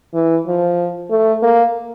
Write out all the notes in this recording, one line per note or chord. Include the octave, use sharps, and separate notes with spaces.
E3
F3
A3
A#3